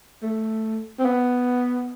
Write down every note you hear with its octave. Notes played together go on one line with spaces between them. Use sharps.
A3
C4
B3